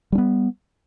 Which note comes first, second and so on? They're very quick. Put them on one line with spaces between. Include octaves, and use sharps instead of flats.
G3 D4 B3